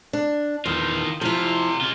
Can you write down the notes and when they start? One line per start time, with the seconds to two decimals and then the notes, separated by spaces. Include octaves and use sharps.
0.13 D4
0.66 E2 D#3 F4
1.21 C3 F3 E4 F4
1.81 G#3 F4